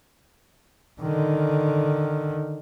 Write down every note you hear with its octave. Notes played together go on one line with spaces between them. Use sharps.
D3 D#3